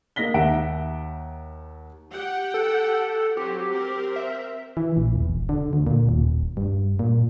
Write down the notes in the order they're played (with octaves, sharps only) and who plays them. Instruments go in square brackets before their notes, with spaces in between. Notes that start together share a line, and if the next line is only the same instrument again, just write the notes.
[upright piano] A#3 D#4 A#6 B6 G7
D#2 E5 F#5 A#5 D7
[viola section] G4 F#5 G5
[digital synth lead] A4
[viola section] F#3 C4 [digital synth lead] G4
[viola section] C4 A#4
[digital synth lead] E5
[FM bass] E3
A#1
E1
D3
D2
A#2
D#1
G2
A#2